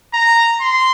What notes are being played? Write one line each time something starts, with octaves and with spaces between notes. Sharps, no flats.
A#5
C6